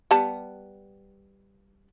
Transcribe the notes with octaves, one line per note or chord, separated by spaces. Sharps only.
G3 B3 A5